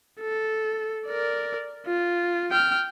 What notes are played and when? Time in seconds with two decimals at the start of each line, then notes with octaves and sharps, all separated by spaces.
0.20 A4
1.07 A#4 D5
1.86 F4
2.52 G5 F6